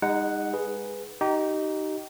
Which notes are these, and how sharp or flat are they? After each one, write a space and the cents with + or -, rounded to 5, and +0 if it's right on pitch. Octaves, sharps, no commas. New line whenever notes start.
G#3 -40 D#4 +0 F#5 +0
G#4 +0 B4 +0
D#4 +0 G4 -30